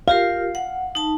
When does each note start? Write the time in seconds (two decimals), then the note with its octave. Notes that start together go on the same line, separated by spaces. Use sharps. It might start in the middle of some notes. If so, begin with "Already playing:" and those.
0.08 F4 G4 A#4 F5
0.55 F#5
0.95 D#4 A5